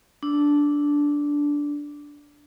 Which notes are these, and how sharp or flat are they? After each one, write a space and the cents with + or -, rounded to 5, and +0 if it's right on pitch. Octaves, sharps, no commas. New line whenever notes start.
D4 -10